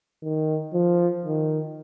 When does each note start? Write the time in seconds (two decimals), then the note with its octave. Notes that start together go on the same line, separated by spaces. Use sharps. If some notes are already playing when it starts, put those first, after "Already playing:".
0.23 D#3
0.74 F3
1.25 D#3